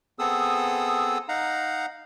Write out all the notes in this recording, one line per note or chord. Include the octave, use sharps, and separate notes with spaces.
B3 C4 G#4 A4 D#6 E6
D#4 F5 F#5 A#5